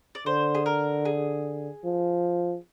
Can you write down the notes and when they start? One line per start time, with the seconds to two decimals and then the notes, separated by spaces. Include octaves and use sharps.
0.15 D5
0.26 D3 C5
0.55 G#4
0.66 A#4
1.05 G#4
1.84 F3